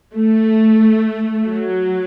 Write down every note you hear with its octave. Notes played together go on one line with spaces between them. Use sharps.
A3
F#3